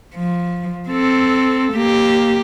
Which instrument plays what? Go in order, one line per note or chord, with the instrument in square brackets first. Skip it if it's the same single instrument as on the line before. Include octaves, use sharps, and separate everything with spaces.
[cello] F3
C4 A4
A#3 G4